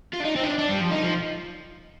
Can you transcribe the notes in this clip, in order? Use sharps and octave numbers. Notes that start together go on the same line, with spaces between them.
F4
D4
D#4
C4
D#4
D4
D4
G3
F3
D#4
F3